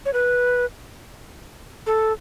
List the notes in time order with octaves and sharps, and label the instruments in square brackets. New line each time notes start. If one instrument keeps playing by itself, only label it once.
[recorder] C#5
B4
A4